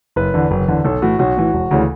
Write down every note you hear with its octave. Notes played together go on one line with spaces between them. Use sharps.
F#1 B4
E2 D3
F#1
E2 D3
B1 A4
A2 E3 F#4
B1 F#4
A2 E3
E1
D2 C#3 E3